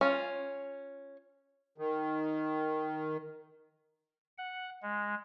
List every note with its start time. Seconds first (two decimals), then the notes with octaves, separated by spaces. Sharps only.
0.01 C#4 F4
1.78 D#3
4.38 F#5
4.82 G#3